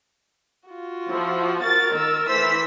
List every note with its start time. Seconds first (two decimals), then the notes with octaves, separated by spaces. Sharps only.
0.69 F4 F#4
1.10 F3 E4
1.64 A#4 A6
1.94 D#3 E6
2.29 E3 A3 E4 C5 E6 B6